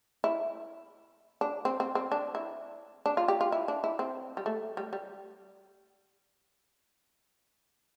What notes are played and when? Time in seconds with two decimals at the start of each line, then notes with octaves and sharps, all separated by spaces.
0.24 E4
1.41 D4
1.65 C4
1.80 C4
1.95 C4
2.12 D4
2.35 E4
3.06 D4
3.17 F4
3.28 G4
3.41 F4
3.52 E4
3.68 D4
3.84 E4
3.99 C4
4.37 G3
4.46 A3
4.77 G3
4.93 G3